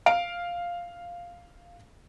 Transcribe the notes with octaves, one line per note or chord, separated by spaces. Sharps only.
F5 D7